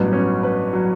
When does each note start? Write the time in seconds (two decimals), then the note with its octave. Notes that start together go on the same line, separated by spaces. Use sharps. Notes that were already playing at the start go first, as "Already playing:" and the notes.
Already playing: A1 G2 F#3 B3
0.13 C#4
0.43 B4
0.73 F#3